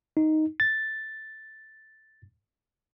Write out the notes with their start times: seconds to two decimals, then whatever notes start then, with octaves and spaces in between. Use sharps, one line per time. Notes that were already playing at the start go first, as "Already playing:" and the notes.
0.17 D#4
0.60 A6